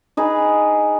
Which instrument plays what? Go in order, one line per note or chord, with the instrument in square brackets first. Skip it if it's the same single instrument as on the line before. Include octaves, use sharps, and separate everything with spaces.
[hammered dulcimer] D#4 G#4 B4